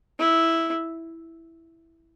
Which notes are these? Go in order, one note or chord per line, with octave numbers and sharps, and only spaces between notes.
E4